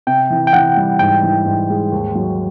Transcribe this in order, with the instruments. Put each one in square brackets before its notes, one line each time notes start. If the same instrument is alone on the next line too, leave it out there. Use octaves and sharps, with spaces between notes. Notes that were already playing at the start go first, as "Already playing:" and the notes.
[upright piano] C3 [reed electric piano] G5
[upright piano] E3
[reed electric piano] G5
[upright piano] E3 [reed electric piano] F#5
[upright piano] G3
[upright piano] G#2 [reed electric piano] G5
[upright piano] E3
G#2
G#3
D#2
F#3